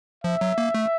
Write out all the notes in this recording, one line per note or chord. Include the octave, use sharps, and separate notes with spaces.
F3 E5
F#3
A#3
A3